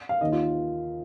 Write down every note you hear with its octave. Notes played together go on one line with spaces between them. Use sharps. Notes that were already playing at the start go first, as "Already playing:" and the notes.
F5
D#2 D#3 D#5
F4